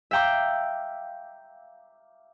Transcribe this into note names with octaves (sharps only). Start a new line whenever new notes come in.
E5 F5 G5 A#5 D6